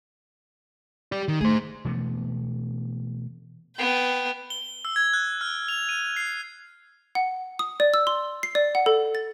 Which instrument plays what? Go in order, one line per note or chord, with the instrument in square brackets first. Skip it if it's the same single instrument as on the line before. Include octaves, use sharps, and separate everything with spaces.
[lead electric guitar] G4 D5
D#3
[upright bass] A3 [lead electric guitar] G#4 C5
[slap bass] B2 E3 A3 B3
[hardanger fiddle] B3 G5
[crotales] G7
E6
G#6
F#6
F6
F7
D#7
C7
[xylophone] F#5
D#6
D5
E6
C6
C7
D5
F#5
A4
A6